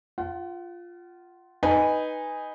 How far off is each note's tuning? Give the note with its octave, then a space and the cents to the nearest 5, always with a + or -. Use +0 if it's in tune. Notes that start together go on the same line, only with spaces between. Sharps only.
F4 +0 F#5 +35
D#4 +0 B4 +0 G#5 -20